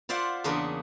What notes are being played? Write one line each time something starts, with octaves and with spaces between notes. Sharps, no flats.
F4 C5 D5 E5 F#5
E2 C#3 A#3 C#4 D4 B4